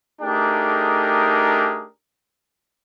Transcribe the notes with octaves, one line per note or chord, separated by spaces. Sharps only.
A3 D4 D#4 G4 G#4 A#4